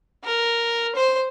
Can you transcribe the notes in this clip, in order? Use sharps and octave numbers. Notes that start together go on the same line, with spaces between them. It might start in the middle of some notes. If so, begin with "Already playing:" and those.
A#4
C5